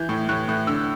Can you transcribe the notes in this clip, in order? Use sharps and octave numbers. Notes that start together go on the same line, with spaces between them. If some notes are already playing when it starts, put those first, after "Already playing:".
Already playing: E3 G6
A2
A2 F#6
A2
D3 E6